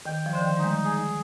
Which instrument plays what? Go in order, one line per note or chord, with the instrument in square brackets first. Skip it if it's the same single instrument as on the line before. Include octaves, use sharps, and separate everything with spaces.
[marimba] D#3 [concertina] G5
[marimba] F3
[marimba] D3 [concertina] C5
[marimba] D#3
F3
[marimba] G3 [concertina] D#4
[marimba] G#3
[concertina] G#4